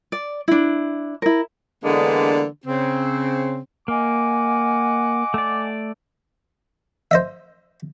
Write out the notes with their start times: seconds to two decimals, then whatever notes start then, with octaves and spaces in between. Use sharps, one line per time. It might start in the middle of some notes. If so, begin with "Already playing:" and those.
0.12 D5
0.48 D4 E4
1.22 E4 A#4
1.84 D3 E3 G#3 A#3 B3 D4
2.66 C#3 C4
3.88 A#3 D#5 F#5 G#5 D6
5.34 A3 D5
7.11 C5 D#5 E5